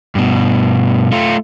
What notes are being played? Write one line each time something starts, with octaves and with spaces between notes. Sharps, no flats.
G2 B2
A3 F4